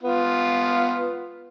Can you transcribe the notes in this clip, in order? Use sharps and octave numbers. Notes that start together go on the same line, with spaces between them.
B3 F4